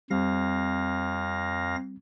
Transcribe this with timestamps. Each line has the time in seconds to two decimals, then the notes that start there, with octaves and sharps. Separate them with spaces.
0.11 F2 G3 C4 F5 A#6